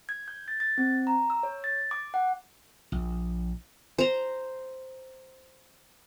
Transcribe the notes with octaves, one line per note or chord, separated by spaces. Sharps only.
G#6
G6
A6
A6
C4
A#5
E6
C#5
A6
D6
F#5
A#1
C5 A#5